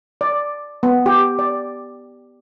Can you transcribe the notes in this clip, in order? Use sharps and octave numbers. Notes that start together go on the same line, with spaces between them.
D5
B3
G4
D5